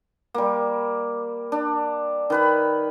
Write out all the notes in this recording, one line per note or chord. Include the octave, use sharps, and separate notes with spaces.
G3 A#3
D4
D#3 B4 B5